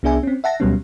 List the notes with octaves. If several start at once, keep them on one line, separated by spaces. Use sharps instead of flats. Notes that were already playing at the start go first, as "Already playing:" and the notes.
C2 B3 D4 G#4 E5 G#5
C4 C#4
E5 F#5 A5 A#6
D2 B2 F#3 G3 B3 C#4